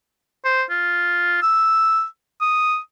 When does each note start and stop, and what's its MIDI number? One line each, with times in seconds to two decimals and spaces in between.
0.45 0.63 72
0.70 1.41 65
1.42 2.04 88
2.41 2.78 87